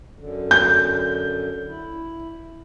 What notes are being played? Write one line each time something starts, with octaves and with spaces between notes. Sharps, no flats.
F#2 D3
G6
E4